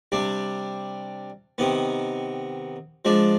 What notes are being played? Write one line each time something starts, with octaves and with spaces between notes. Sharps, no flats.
C3 G3 D4
C3 D#3 B3
F3 G#3 D4